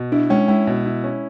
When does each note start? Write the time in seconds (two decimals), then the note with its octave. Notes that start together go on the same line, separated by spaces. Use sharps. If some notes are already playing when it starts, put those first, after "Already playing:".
Already playing: B2
0.12 D4 E4
0.30 G#3 C#4
0.48 G#3 E4
0.67 B2
0.86 E4
1.04 C#4